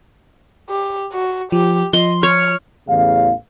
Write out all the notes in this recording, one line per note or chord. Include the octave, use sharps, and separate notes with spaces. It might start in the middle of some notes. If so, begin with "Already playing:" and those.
G4
F#4
F3 G4
F3 D#5 C6
C#5 F6
A1 E2 C#3 F5